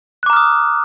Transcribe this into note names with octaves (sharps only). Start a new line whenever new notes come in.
A#5 D6 D#6 F6 F#6